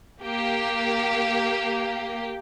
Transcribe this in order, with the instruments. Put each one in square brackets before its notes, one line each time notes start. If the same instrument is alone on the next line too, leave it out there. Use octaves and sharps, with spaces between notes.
[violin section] A#3 G4